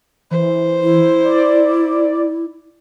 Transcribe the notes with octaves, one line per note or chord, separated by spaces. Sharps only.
E3 C5
E4
D5